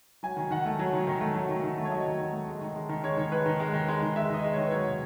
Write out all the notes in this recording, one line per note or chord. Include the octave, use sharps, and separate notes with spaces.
F#3 G#5
D#3
D#3 F#5
A3
F#3
D#3
D#3
A3
F#3
D#3
D#3
A3
C#5
F#3 D#5
D#3
D#3
A3
G#3
D#3
G#3
D#3
G#3 C#5
D#3
G#3 B4
D#3
G#3
D#3
G#3
D#3
G#3 E5
D#3 D#5
G#3
D#3 C#5
B4
F#3 C#5
B2